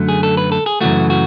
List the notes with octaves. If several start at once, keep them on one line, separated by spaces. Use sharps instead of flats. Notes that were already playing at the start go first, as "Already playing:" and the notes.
Already playing: F#2 D3 F#3 A3
G#4
A4
B4
A4
G#4
F#2 C#3 E3 A3 F#4
F#4